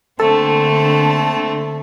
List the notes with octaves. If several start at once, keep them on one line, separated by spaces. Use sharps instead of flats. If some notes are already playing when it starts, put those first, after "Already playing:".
D3 A3 A#3 C4 A4 A5